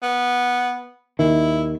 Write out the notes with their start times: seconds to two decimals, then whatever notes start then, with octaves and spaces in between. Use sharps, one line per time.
0.02 B3
1.19 D#2 D#3 E4